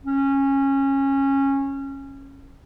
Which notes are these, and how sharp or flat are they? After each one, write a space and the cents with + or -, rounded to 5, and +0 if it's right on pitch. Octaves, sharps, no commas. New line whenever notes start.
C#4 -20